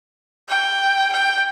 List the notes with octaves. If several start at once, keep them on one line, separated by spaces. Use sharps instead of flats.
G5
G5